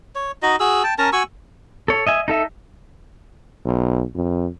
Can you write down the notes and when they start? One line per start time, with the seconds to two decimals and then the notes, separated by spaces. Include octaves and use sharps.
0.15 C#5
0.42 D#4 F#4 D#5
0.60 F#4 G#4 E6
0.84 G5 A5
0.98 C#4 A#4 A5 A#5
1.13 F#4 G#5 C#6 E6
1.88 A4 C#5
2.07 D#5 E5 G#5
2.28 D#4 A4 E5
3.65 B1
4.15 F2